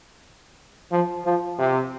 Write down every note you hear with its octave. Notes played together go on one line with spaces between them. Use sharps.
F3
F3
C3